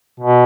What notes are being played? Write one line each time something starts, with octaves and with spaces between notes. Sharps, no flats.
B2